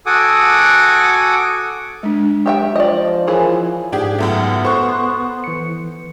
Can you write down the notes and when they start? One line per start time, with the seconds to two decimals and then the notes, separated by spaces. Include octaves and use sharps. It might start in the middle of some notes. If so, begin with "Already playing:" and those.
0.06 F#4 A4 F#5 G#5 D6 D#6
2.03 G#3 D4
2.46 G4 E5 G5
2.76 F3 D5 D#5
3.28 E3 E4 G#4 A#4 C#5
3.92 G#2 D4 G4 G#4
4.19 C#2 F#2 A3 B3
4.65 A4 C5 C6 C#6 F#6
5.44 E3 C#7